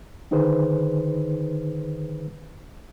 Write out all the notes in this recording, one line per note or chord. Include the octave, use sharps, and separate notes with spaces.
D3 D#3 D#4 G#4 B4 C5